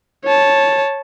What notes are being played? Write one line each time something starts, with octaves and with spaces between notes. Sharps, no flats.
C#5 A5